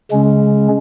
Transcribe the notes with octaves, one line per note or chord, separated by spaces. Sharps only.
C#3 G#3 C#4